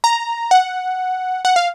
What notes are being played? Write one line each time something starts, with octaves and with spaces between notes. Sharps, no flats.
A#5
F#5
F#5
F5